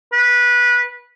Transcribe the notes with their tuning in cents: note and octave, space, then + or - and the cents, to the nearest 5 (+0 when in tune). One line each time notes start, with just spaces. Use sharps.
B4 -20